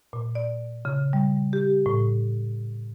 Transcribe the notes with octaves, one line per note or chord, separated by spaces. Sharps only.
A#2
D5
C#3
G3
G4
A2